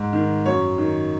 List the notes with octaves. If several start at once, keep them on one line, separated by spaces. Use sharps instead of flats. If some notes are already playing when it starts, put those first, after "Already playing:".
Already playing: G#2
D#3
F#2 C#5
D#3